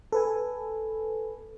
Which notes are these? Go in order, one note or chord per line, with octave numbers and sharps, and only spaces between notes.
A4 B4 G#5